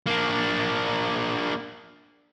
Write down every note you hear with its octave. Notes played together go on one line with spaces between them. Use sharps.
A#3 D4